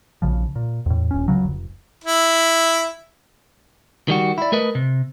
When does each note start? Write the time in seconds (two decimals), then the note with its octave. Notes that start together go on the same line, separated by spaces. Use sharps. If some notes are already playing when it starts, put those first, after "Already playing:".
0.22 A#1 C#3 F3
0.56 A#2
0.86 E2 A2
1.11 D#1 C#4
1.28 C#2 C#3 F#3
1.45 F1
2.04 E4
4.08 D#3 G3 F#4
4.38 E4 D5
4.52 A3 A#4 B4 D#5
4.75 C3